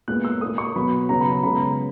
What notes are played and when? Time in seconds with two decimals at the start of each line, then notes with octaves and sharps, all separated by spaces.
0.08 A#2 G#3 B3 F#6
0.25 E6
0.41 A#2 A#3 D#6
0.58 C#6
0.75 B2 F#3 B3 B5
1.09 C#3 F#3 B3 A#5
1.21 B5
1.32 A#5
1.43 C#3 G#3 B3 B5
1.55 A#5